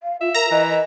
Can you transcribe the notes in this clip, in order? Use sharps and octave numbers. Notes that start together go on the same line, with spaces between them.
F5
F4 E5
A#4 A#5
E3 D#5
D#5